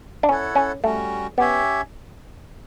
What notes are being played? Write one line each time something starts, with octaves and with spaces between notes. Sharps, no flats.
D4
C#4 E4 A4 C#5 F#5
C#4
G3 A3 C#4 F#4
B3 C#4 G4 C#5 E5